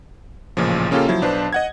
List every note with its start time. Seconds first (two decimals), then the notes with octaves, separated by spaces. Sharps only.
0.57 A1 A#2 C#3 F3
0.91 C#3 A#3 C#4 F4 G4 A4
1.08 F3 F#3 E4
1.22 B1 D4 B4 C5 A5
1.53 D#5 F#5 G#6